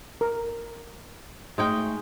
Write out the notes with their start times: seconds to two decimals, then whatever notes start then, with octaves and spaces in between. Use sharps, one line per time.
0.21 A#4
1.58 G#3 A3 D#4 G5